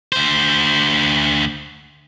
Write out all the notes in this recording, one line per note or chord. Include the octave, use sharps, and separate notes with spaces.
D2 C5